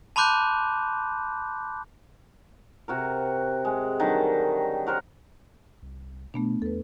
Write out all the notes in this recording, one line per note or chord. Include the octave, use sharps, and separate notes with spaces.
A5 B5 C6 D6 F#6 G6
C3 F#4 A#4
G#3
D3 D#3 F#3 G3
F#4 A#4 C5
C2
B2 A3 B3 D4
E2 A4 B4